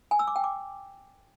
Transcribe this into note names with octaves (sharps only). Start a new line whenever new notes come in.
G#5
E6
D6
G5
D6